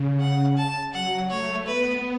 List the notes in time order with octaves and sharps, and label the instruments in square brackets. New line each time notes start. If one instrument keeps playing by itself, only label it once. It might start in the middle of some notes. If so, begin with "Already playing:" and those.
Already playing: [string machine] C#3
[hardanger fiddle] F#5
A5
[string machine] F#3 [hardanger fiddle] F#5
[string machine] A3 [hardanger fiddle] C#5
[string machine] B3 [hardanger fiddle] B4